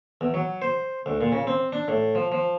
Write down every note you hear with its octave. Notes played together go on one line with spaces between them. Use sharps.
E2
F#3
C5
D2
A#2
C#3
C4
D4
A2
F3
F3